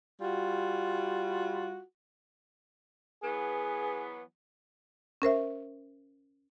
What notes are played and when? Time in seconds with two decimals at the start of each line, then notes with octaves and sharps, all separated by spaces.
0.20 G3 F4 F#4
3.22 E3 F#3 B3 G#4
5.22 C#4 A#4 C5 E5